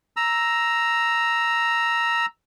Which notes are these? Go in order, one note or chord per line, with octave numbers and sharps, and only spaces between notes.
A#5 E6